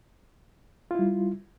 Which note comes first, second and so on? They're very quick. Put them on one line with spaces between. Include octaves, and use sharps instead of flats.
F4 E4 G3